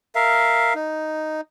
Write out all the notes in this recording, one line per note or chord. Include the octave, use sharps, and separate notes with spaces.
A#4 E5 F5
D#4